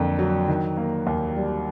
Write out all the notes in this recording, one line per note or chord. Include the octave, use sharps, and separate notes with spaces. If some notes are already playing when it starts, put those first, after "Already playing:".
Already playing: F2 D3 A#3
F#3
D#3
A#3
D#2
G3